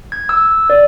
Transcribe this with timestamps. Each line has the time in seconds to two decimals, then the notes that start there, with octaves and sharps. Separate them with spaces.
0.12 G#6
0.29 E6
0.70 D5